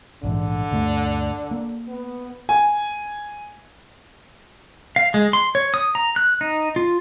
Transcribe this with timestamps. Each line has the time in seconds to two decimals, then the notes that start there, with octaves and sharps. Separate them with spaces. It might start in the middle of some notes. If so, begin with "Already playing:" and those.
0.23 A#1 G#2 D3 E3
0.71 D2 G2 A3
1.51 A#3
1.88 B3
2.49 G#5
4.96 F5
5.14 G#3
5.33 C6
5.55 C#5
5.74 D#6
5.95 A#5
6.16 F#6
6.41 D#4
6.76 F4